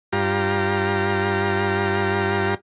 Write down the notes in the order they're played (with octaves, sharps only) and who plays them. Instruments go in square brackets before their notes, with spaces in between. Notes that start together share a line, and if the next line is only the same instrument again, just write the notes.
[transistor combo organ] G2 F4 G4 A#5